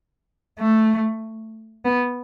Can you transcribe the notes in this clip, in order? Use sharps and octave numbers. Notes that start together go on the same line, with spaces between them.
A3
B3